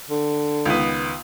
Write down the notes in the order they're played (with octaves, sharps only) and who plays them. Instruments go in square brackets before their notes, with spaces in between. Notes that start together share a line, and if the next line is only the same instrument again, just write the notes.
[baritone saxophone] D3
[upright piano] C#2 D#3 B3